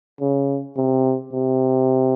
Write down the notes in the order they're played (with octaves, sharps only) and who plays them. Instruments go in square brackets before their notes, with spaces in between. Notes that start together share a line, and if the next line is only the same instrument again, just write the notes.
[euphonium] C#3
C3
C3